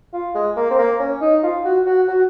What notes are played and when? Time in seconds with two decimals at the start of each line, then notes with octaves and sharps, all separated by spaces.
0.13 F4
0.34 G#3
0.57 A#3
0.71 C4
0.79 A#3
0.99 C#4
1.21 D#4
1.43 F4
1.65 F#4
1.86 F#4
2.08 F#4